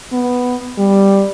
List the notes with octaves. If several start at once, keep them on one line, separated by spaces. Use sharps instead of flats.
B3
G3